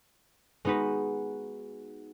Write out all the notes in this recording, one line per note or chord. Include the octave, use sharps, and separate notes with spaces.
G#3 B3 D#4 F#4 B4